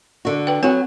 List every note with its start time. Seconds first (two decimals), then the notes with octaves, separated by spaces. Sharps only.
0.25 D3 F#4
0.47 B4 G5
0.63 F#3 B3 C4 F#4 G#5